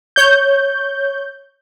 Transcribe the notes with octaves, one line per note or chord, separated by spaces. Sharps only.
C#5 G6